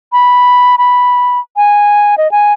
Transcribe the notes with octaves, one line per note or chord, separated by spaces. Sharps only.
B5
B5
G#5
D#5
G#5